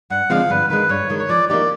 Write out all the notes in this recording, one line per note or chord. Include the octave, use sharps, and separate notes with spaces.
G2 F#5
D3 F3 G#3 C4 F5
G2 B4
D#3 G#3 B4
G2 C#5
D#3 G#3
C#5
F3 D5
A#3 D#4 G4 D5